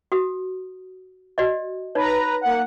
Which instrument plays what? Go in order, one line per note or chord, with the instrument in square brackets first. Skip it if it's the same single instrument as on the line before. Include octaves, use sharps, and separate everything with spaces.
[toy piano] F#4 D#6
F#4 D5 D#5
[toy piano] D#4 C#5 [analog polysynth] B4 A#5
[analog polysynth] A#3 F#5